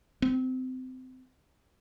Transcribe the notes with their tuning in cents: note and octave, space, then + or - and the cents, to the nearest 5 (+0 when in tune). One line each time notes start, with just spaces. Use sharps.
C4 -25